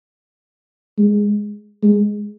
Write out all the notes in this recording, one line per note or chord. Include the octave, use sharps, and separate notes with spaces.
G#3
G#3